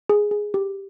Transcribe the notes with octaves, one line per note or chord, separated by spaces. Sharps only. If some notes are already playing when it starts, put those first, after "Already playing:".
G#4
G#4
G4